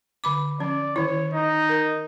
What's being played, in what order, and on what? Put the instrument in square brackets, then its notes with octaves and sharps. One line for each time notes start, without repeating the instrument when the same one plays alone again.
[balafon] D3 B5 D6
[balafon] F3 C#4 [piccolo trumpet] D5
[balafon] D#3 E4 [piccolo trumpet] C#5
[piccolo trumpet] D#4
[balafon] A#4